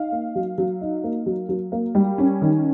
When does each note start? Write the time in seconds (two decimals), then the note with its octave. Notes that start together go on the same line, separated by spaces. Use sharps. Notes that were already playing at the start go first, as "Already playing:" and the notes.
Already playing: D#4 F5
0.12 A#3
0.35 F#3
0.58 F#3
0.81 D#4
1.04 A#3
1.26 F#3
1.49 F#3
1.72 A#3
1.95 G3
2.18 C#4
2.42 D#3